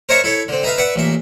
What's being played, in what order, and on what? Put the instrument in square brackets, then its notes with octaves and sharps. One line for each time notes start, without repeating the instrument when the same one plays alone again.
[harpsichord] A#4 C5 C#5 D#5 E5 C#6
E4 A4 C#5
D3 C4
D#4 B4 E5 F5
B4 D5 E5 F#5
A1 A#2 E5